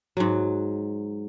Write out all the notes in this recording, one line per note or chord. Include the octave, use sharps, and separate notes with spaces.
G#2 F#3